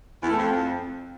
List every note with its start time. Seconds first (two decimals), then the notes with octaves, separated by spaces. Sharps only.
0.21 E2
0.29 A3
0.37 F2